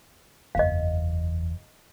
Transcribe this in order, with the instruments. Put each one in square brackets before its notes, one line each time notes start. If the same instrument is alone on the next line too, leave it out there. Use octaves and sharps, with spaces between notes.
[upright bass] F#1 E2 [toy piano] D#5 F5